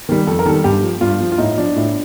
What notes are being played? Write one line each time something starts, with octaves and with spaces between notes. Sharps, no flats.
D#3 G3
F2 A4
A#4
D#3 G3 A4
G2 G4
F3
G2 F4
F3
F4
A2 D#4
F3 D4
A2